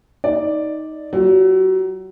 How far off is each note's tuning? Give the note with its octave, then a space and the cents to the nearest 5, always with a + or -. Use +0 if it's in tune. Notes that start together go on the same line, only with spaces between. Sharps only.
D#4 +10 D5 +0
F#3 +30 F4 +5